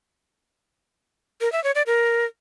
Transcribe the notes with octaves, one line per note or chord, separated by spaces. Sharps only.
A#4
E5
C#5
D5
A#4